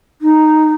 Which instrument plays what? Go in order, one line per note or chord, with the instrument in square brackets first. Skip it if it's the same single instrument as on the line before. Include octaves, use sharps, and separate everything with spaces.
[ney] D#4